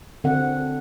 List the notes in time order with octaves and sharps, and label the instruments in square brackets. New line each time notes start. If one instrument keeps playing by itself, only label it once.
[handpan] D3 C4 F#5